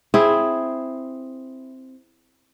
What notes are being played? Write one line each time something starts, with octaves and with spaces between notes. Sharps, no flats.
C4 E4 G#4